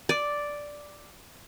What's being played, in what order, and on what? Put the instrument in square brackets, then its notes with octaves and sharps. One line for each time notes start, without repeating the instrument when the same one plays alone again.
[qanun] D5